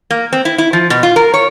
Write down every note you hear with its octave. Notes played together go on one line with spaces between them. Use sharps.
A#3
C4
E4
E4
F3
B2
F4
A#4
C#5